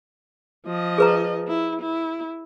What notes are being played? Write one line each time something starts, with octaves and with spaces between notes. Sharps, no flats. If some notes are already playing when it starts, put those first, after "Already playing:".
F3 D#5
G#4 B4 A#5
E4
E4